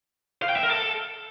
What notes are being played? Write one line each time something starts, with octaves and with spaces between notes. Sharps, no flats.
F5
G5
E5
A#4
A4